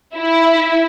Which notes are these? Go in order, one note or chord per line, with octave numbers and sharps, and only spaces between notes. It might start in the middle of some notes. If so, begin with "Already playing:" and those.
E4